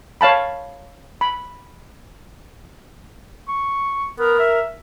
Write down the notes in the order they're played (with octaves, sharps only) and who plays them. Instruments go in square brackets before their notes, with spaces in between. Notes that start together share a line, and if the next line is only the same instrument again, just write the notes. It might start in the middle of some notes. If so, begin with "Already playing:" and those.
[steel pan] C#5 F5 A5 B5
B5
[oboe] C#6
[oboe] B3 [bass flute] A#4
[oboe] E5